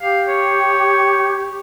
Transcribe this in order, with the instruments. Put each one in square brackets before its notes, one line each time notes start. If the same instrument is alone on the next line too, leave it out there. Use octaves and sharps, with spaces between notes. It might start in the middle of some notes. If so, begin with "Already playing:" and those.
[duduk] G4 [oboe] F5
[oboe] C#5